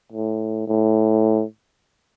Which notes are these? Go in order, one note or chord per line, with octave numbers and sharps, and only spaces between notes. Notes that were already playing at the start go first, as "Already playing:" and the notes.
A2
A2